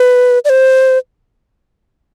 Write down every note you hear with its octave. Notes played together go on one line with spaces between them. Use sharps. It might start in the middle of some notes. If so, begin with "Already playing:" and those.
Already playing: B4
D5
C5